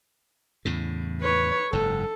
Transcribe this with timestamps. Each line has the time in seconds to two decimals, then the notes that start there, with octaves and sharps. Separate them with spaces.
0.65 E2 A2 C#3
1.21 B4 C#5
1.73 F#1 G#2 A4